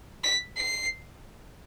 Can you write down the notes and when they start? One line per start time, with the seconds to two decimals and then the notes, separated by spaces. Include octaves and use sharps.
0.24 B6
0.57 C7